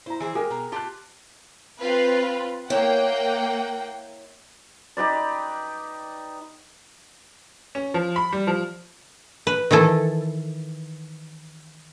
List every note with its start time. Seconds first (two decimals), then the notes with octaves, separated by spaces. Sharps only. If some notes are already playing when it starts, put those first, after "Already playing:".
0.06 E4 C5 A#5
0.20 E3 G#4 C5
0.35 G#3 G4 G#4 A#4
0.50 B2 A#5
0.72 F4 G4 A5 F#6
1.80 C4 F4 B4
2.70 A#3 E4 C#5 F#5 G5
4.97 D#4 G4 B4 D5
7.75 C#4
7.94 F3
8.16 B5
8.32 G3
8.47 F3
9.47 B4
9.71 D#3 E3 E4 A4